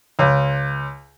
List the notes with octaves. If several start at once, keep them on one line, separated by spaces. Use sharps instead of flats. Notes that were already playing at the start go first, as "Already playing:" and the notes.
C#2